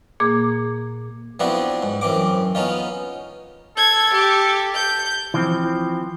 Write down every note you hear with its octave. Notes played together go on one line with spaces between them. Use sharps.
A#2 A#3 G#4 D6
F3 B3 C4 D4 E4 F#4
G#2
F#2 E3 C4 D6
B3 C#4 D#4 F4
A4 G#6
G4
G6
E3 F3 C4